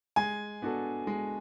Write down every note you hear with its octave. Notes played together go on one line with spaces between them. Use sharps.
G#3 G#5
B3 D4 F#4 A4
G#3